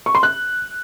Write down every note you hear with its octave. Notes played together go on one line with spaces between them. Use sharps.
C#6
C6
F#6